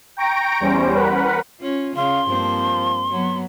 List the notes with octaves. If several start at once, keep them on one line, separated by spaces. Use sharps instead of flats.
G5 A#5 C#6 A#6 D7
E2 G3 C#4 C5
A#4 B4 F#5 B5
C#4 F4
C#3 F5 C6
G2 F3 A#3 C4
F#3 B3